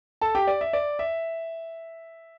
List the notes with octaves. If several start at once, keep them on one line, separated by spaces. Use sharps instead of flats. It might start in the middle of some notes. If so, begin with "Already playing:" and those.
A4 A5
G4 G5
D5
E5
D5
E5